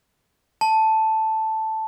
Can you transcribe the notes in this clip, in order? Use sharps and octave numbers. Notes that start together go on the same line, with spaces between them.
A5